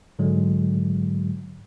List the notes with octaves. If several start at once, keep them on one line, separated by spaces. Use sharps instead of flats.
G#2 D3 F#3 G#3